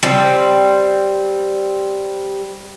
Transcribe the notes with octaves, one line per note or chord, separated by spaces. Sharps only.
G3 C4